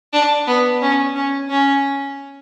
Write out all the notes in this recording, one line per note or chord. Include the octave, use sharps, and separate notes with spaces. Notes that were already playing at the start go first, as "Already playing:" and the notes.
D4
B3
C#4
C#4
C#4